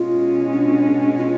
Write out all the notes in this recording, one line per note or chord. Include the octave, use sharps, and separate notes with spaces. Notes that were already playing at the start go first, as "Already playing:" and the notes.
Already playing: B2 G#3 C#4 F4
D4
F4